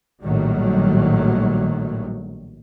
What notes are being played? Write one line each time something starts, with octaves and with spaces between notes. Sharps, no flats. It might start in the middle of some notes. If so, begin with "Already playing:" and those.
A#1 A2 D#3 F#3 G3